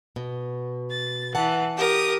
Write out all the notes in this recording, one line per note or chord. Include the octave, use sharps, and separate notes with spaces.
B2
A6
E3 F#5 A5
G4 A#4 D#6